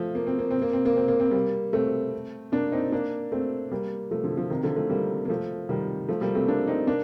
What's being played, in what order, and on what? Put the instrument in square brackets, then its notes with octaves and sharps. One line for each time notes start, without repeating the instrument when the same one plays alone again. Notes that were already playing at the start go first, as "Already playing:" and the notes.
Already playing: [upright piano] F3 A3
A#3
C4
A#3
C4
A#3
C4
A#3
C4
A#3
C4
G3 A#3
A3 C4
A#3 D4
C4 D#4
A#3 D4
A3 C4
G3 A#3
F3 A3
D3 F3
D3 F3
C3 D#3
D3 F3
F3 A3
G3 A#3
A#3
F3 A3
D#3 G3
F3 A3
G3 A#3
A3 C4
A#3 D4
C4 D#4
A#3 D4